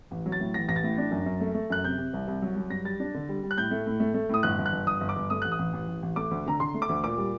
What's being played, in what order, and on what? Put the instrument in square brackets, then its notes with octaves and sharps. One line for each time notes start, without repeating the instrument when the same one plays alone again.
[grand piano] A1
F#3
A6
A2
A1 A#6
A1 A#6
A6
A2
D4
F#2
F#2
A3
A3
F#2 F#6
C3 G6
C3
C2
C2
F#3
F#3
G2 A#6
G3 A6
D4
D3
G3
G3
F#6
A2 G6
A3
A2
A3
A3
A2 D#6
G1 F#6
G1
F#6
G1
G1 D#6
G1
D6
G1
A3 D#6
A1 F#6
D#6
A1
A1
A1
A1
A3 D6
D2
D3 A#5
D3 C6
A3
D6
D2
A#2 D6
G3